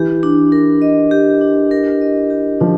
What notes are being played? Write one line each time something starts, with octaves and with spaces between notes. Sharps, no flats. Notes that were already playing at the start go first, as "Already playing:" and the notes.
Already playing: E3 G4
D4
A#4
D#5
G4
D4
A#4
D#5
G4
F3 D4